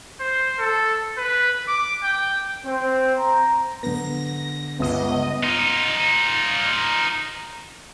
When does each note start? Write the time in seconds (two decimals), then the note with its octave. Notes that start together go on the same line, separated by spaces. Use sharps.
0.20 C5
0.58 A4
1.18 B4
1.68 D6
2.03 G5
2.65 C4
3.18 A#5
3.83 D3 B3 A#6
4.79 G1 C#2 B3 D#5
5.44 D#4 F4